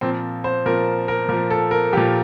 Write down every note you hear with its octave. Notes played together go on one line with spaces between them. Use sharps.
A#2 F3 C4
C5
A#2 F3 A#4
A#4
A#2 F3 A#4
A4
A#4
A#2 F3 G4